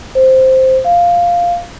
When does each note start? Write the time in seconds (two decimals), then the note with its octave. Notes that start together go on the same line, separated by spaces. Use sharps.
0.15 C5
0.85 F5